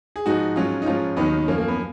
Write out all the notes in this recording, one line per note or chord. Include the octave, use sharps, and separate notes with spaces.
G#4
G#2 F3 D#4 F#4
G#2 F#3 C#4 F4
D#4
G#2 F3 C#4 F4
D#2 D#3 F#3 B3 D#4
F#2 F3 A#3 C#4
A#3
B3